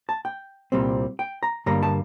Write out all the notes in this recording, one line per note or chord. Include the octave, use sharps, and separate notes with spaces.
A5
G5
C2 A#2 G3 C4
G5
A#5
G2 D3 G3 A#3 A#5
A5